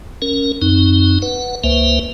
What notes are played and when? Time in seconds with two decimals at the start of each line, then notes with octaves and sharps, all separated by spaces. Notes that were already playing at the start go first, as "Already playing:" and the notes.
0.22 C#4 A#4
0.62 F#2 C4 D#4
1.22 B4 F#5
1.64 C#2 A#3 B4 C5 E5